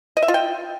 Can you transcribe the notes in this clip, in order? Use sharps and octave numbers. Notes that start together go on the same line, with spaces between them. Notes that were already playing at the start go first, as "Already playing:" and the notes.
D#5
E5
F4
G5